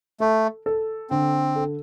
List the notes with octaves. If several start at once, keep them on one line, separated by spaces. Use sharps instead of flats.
A3 A4
A4
D3 C4
A4